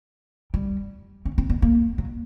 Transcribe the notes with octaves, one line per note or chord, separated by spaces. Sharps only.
G3
C#4
C4
B3
A#3
F#3